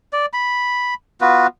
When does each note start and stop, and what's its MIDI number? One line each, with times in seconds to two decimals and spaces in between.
0.13 0.26 74
0.33 0.94 83
1.21 1.47 59
1.21 1.47 65
1.21 1.47 66
1.21 1.47 71